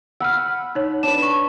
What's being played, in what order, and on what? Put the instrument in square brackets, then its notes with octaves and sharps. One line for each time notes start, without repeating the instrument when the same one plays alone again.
[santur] F#5 B5 [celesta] E6 F6
[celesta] D#4 C#5
[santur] D4 B4 [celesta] E7
[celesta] C#6